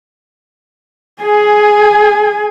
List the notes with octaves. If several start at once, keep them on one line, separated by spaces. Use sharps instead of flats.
G#4 G#5